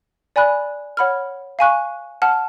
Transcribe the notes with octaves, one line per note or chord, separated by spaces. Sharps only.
D5 G#5 B5 F#6
C#5 F#5 B5 F6
F5 G#5 C#6 F#6
F#5 A5 F6